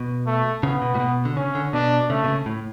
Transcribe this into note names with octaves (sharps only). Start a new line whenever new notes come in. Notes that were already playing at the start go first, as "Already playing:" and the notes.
Already playing: B2
A3
C#3 B3
B2
A2
B2
D3
C#3 C#4
D3
B2 D4
C#3 A3
B2
C#3
A2